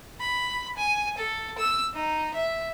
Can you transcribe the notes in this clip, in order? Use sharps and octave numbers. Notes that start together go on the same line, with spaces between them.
B5
G#5
A4
E6
D#4
E5